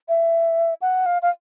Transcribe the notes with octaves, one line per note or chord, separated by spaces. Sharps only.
E5
F#5
F5
F5